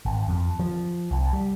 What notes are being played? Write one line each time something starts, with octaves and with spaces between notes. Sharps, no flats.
G#1
F2
F3
C2
G3